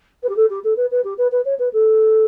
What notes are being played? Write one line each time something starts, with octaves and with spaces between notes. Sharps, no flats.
B4
G4
A4
G4
A4
B4
B4
G4
B4
B4
C#5
B4
A4